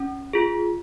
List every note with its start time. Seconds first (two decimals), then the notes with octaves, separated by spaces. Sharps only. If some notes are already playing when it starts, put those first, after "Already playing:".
Already playing: C#4
0.33 F4 G#4